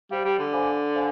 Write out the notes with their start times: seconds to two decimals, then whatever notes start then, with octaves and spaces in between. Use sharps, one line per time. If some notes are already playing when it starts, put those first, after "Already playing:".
0.11 G3 G4 C5 F5
0.25 G3
0.39 D3
0.53 C5 F5 G#5 B5 D6
0.95 C5 F5 G#5